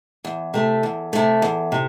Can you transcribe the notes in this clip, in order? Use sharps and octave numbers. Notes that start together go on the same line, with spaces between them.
E2
C3 A3
E2
C3 A3
E2
C3